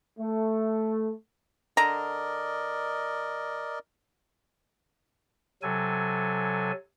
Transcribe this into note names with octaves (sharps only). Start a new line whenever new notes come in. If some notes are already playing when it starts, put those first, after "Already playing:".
A3
D3 A#4 D5 D#5 A#5
C3 F#3 A4 G#5